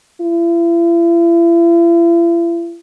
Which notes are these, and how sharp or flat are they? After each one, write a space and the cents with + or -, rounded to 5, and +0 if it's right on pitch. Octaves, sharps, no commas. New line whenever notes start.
E4 +45